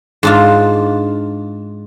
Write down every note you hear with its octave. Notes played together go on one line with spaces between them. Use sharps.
G#2 D4 F4